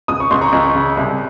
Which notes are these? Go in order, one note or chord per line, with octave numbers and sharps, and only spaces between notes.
C#2 D#6
C#6
C#2 C6
A#5 C#6
C#2
C#3
C2